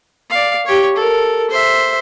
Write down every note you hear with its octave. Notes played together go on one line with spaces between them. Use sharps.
D5 F5
G4 C#5
A4 A#4
C5 E5